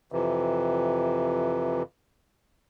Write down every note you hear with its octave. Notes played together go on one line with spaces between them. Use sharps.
F2 C3 E3